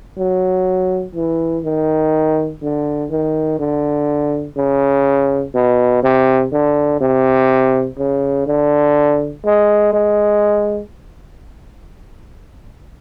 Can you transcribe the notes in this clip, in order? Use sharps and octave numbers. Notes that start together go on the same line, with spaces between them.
F#3
E3
D#3
D3
D#3
D3
C#3
B2
C3
D3
C3
C#3
D3
G#3
G#3